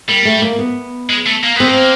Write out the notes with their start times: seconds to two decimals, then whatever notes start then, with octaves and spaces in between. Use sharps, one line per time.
0.08 G3 A#3
0.25 A3
0.42 A#3
0.59 B3
1.10 G#3
1.26 A3
1.44 A#3
1.56 B3 C4
1.68 A#3